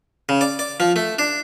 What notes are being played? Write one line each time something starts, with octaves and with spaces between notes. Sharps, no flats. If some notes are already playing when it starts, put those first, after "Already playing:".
C#3
D5
D5
F3
A3
D4